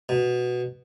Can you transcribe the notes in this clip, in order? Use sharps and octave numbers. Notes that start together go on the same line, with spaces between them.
B2